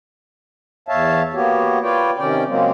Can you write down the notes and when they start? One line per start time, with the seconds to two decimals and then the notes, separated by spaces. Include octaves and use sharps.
0.88 E2 C#5 E5 F5 A5
1.34 A#3 B3 F#4 G4 C#5
1.83 F4 B4 C#5 D5 G5
2.18 C3 D#3 C#4 D5 G5
2.48 C#3 F#3 G#3 A#3 C4